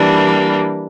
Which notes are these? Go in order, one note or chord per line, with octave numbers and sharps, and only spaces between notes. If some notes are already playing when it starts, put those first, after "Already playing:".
Already playing: E3 G3 A#3 D4